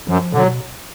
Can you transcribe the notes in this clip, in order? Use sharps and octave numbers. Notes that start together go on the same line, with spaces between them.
F#2 F3
B2 D3 F#3